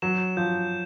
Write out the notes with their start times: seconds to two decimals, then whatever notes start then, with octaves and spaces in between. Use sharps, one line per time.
0.02 F#3 E7
0.37 F3 G6